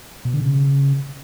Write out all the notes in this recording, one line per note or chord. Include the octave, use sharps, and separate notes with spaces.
B2
D3
C#3